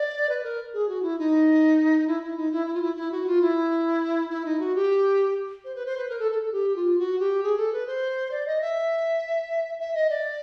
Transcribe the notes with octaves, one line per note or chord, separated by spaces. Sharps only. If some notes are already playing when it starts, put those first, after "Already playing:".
Already playing: D5
B4
A#4
G#4
F#4
E4
D#4
E4
E4
D#4
E4
E4
F4
E4
E4
F#4
F4
E4
E4
D#4
F#4
G4
C5
B4
C5
B4
A#4
A4
A4
A4
G4
F4
F#4
G4
G#4
A4
B4
C5
D5
D#5
E5
E5
D#5
D5